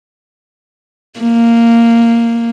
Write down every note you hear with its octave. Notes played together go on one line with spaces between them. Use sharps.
A#3